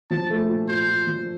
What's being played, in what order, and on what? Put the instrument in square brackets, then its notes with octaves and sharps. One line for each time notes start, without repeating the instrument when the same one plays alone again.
[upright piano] F3 [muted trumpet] A5
[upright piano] A3
A#2
[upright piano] A#2 [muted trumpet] C5
[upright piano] A#2
F3